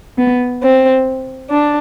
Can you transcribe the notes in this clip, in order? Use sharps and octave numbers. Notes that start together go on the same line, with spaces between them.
B3
C4
D4